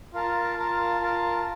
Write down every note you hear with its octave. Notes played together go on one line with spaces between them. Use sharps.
F4 A#4 F5 A5
F4 A#4 F5 A5
F4 A#4 F5 A5